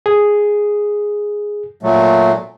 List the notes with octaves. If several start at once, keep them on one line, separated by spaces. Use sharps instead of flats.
G#4
A#2 F#3 A3